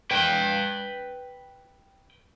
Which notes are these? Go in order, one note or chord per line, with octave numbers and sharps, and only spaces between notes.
B4 G5